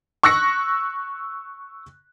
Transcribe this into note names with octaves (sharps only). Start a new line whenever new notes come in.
C#6 E6 F#6 A#6 C#7